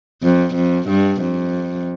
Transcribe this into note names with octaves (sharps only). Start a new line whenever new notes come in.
F2
F2
G2
F2